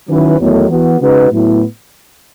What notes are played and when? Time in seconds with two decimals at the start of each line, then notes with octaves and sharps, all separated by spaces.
0.09 D#3 F#3 C#4 E4 B4
0.40 E2 D#3 F#3 A3
0.70 E3 B3 F#4
1.00 C#3 G#3 D#4 F#4 B4
1.31 A2 F#3 B3 E4